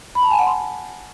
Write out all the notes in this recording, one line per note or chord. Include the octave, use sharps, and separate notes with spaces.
B5
A5
G#5
F#5
C6